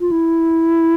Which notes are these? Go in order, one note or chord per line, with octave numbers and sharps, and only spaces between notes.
F4
E4